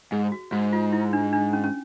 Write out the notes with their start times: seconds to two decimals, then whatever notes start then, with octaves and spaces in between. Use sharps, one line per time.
0.12 G#2 G#4
0.32 F#4
0.52 G#2 F#4
0.73 F4
0.93 E4
1.13 D4
1.33 D4
1.53 C#4
1.64 C#4